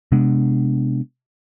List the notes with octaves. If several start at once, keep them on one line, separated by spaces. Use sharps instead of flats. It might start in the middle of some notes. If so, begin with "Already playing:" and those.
C3 G#3 B3 D4